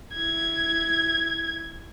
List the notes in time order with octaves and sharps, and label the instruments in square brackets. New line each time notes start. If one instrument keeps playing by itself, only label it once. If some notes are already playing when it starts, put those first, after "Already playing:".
[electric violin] E4 G#6